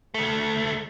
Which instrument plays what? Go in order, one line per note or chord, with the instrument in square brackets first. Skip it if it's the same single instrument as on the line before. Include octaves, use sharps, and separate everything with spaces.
[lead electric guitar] D2 A3